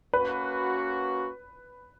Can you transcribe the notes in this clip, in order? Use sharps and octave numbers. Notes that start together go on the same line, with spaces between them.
A#3 C#4 F#4 B4